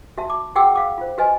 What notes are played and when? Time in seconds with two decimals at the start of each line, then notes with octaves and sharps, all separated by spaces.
0.18 F#4 E5 A5
0.30 D6
0.56 F#4 G#4 F#5 G5 D6 E6
0.75 F5 D6
0.98 F4 C5
1.18 F#4 B4 D#5 G#5